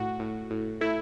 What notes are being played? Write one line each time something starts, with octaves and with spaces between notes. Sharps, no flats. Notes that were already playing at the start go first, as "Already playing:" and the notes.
Already playing: A2 F#4
A2
A2
A3 E4